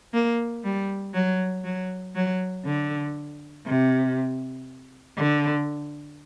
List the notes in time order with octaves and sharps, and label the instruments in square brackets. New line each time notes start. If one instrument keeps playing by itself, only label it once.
[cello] A#3
G3
F#3
F#3
F#3
D3
C3
D3